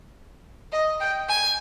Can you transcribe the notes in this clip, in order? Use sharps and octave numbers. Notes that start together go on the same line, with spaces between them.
D#5
G5
G#5